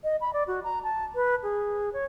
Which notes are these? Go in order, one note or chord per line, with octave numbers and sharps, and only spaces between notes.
D#5
B5
D5
F#4
A#5
A5
B4
G#4
C#5